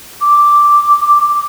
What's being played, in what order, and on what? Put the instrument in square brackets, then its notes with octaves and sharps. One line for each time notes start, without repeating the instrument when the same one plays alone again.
[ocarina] D6